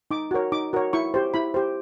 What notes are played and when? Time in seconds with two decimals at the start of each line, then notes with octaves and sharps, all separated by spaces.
0.11 D#4 D6
0.31 F#4 A#4 C#5
0.52 D#4 D6
0.73 F#4 A#4 C#5
0.93 E4 C#6
1.14 G4 C5
1.34 E4 B5
1.54 G4 C5